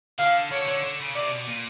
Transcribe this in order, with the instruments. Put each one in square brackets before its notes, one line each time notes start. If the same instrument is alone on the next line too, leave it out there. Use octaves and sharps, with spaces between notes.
[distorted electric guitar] D3 [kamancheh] F5
[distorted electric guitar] D3 [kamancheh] C#5
[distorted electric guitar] D3
D3
C#3
[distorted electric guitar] C3 [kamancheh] D5
[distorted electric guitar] B2
A#2